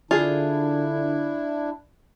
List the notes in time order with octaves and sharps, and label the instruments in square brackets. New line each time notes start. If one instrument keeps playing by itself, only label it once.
[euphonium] D3 [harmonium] D4 E4 [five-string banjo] F4 G#4